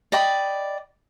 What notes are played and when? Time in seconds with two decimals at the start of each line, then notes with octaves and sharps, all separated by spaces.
0.12 D5 D#5 G5 B5